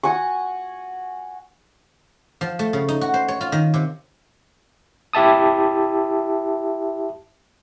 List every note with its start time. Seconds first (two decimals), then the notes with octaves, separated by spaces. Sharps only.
0.03 F#4 F#5 G#5 C#6
2.41 F3
2.59 A3
2.73 C#3
2.88 D#4
3.01 F#4
3.14 C5
3.28 C#5
3.41 F4
3.52 D#3
3.74 C3
5.13 E4 G4 E5 A5 D#6